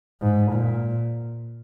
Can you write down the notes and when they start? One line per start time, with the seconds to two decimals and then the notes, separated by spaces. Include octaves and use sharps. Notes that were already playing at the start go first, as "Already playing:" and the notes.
0.22 G#2
0.52 A#2